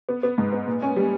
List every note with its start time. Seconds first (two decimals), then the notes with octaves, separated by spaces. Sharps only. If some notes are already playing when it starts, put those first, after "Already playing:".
0.09 B3
0.23 B3
0.38 G#2
0.52 B3
0.67 A#2
0.82 C#4
0.96 G3